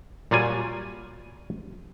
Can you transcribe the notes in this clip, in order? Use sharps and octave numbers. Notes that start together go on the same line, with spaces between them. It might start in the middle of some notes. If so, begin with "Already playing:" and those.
A#2 F#3 G3 F4 D5 G#5